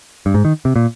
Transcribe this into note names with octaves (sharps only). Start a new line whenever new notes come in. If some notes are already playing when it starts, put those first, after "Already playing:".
G2
G#2
D#3
C3
A#2